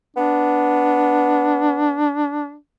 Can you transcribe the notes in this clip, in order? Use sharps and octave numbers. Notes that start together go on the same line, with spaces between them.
B3 D4